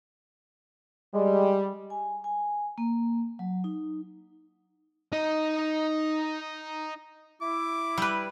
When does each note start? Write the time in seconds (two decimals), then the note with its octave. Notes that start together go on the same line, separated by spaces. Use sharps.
1.14 G3 G#3
1.90 G#5
2.24 G#5
2.78 A#3
3.39 F#3
3.64 D#4
5.12 D#4 D#5
7.41 E4 D6
7.98 G3 B4